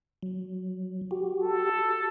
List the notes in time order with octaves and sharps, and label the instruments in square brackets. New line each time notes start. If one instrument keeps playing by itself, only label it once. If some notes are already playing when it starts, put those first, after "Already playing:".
[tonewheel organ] F#3
F#4 G4
[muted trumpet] A4